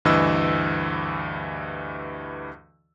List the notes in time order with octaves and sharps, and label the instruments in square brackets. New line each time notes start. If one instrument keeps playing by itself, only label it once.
[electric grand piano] D2 G2 E3 D#5 E6